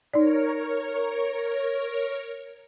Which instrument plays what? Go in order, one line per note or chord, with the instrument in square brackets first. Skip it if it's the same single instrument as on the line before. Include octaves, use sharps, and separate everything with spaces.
[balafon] D#4 D5 [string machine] A#4 C#5